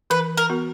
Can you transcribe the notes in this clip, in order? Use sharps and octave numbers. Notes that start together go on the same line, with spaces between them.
E3 B4
A#4
B3 F#4 A#4